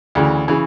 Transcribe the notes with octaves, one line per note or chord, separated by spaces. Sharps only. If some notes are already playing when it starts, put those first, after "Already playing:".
D2 C#3 E3
C#3 E3